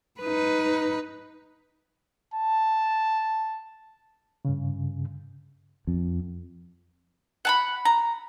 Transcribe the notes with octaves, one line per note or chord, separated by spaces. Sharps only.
D#4 B4
A5
G2 C#3
F2
F#5 A5 B5
A#5